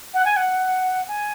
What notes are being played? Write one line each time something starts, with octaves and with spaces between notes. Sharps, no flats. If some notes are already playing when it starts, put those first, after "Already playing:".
F#5
G#5
F#5
G#5